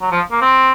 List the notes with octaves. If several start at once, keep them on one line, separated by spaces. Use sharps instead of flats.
F#3
F3
A#3
C4